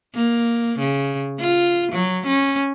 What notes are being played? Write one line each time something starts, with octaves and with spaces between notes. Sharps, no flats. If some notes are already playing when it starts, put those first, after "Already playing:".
A#3
C#3
F4
F#3
C#4